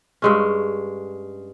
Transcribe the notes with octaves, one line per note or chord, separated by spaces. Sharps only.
G2 G#3 C#4